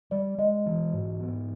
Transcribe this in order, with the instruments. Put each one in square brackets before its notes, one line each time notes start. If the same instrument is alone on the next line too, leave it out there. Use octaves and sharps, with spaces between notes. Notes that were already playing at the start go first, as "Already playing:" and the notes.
[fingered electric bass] G3 [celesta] D5
[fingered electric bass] G#3 [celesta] D#5
[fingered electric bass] E3
G#2
B3